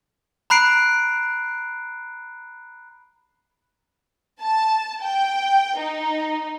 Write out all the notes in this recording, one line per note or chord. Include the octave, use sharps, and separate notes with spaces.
A#5 B5 F#6 C7 D7
A5
G5
D#4